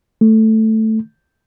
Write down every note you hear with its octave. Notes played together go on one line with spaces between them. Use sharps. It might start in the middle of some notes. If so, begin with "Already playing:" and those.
A3